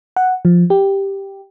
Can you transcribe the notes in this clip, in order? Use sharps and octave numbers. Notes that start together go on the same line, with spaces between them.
F#5
F3
G4